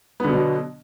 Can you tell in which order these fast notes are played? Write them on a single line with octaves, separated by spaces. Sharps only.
B3 D3 B2 F#3